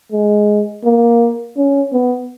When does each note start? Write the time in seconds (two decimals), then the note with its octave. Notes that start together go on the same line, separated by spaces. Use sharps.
0.12 G#3
0.84 A#3
1.57 C#4
1.93 B3